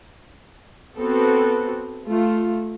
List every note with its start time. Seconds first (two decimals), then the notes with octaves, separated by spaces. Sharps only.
0.98 B3 C4 F#4 A4
2.06 A3 F4